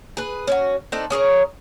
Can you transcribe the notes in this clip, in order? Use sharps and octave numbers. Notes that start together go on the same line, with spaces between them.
G#4 B4
C#4 E4 F#4
C4 D4 D#4 A4
C#4 G#4 A#4 C#5